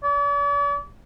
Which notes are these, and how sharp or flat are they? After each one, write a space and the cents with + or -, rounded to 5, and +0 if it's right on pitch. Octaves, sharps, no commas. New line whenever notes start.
D5 -45